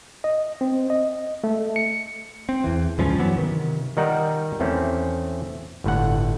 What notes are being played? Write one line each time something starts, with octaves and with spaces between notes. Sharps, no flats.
D#5
C4
D#5
A3
C#7
C4
E2 E3
C#2 G2 F3 C#4
E3 F#3 B3
C3 D#3
D#3 G3 D#4 A#4 F#5
E2 E3 A3 C4 C#4
G1 A2 D3 F#5